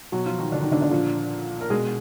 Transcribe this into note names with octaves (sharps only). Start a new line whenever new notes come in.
B2 F#3 F#4
F3 F4
D#3 D#4
D3 D4
D#3 D#4
D3 D4
D3 D4
A#2 F3
A#4
B2 G#3 G#4